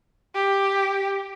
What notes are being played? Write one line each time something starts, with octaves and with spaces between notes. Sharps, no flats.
G4